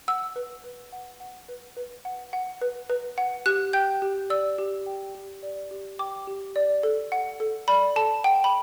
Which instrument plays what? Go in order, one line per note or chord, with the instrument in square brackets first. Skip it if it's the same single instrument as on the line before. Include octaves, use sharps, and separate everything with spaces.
[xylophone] F#5 E6
B4
B4
F#5
F#5
B4
B4
F#5
F#5
B4
B4
F#5
G4 F#6
G5 G6
G4
D5 E6
G4
G5
G4
D5
G4
G5 D6
G4
D5
A4
F#5
A4
D5 B5
A4 A5
F#5 G5
B5